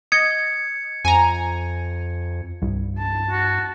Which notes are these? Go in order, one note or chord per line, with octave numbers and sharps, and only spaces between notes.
D#5 G#6 C#7
F2 G#5 A#5
C2 G2
A5
F#4